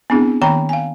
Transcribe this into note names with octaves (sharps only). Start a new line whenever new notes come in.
B3 C4 D4 E4 G#4
D#3 A#3 G5 A#5 B5
F5 G#5